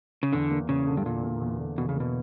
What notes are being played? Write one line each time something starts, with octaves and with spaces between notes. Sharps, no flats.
C#3
E2 D3
A#3
E2 C#3
D3
G2
E2 A#2
A#3
E2
D3
E2 B2
C#3
B2 A#3